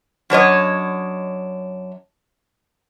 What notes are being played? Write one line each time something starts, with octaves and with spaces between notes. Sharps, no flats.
F#2 D4 C#5 D#5